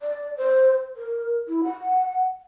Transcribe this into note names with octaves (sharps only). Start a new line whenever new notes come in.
D5
C5
A#4
E4
F#5